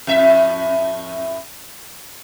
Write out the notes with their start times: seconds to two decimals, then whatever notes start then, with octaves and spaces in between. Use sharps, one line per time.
0.07 F2 A2 E5